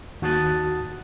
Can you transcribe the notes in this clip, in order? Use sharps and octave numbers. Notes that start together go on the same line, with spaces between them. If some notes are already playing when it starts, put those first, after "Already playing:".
D#2 F#4 A5 D#6 F#6 A6